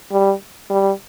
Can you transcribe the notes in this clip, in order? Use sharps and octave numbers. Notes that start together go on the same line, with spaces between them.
G3
G3